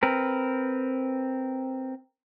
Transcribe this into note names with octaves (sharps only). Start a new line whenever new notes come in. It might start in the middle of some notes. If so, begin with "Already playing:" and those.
C4 A#4 B4